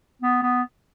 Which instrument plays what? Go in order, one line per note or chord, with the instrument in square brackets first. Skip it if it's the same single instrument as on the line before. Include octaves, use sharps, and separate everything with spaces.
[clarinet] B3
B3